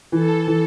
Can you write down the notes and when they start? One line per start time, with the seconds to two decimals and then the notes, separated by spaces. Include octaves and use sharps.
0.12 E3 A4
0.47 E3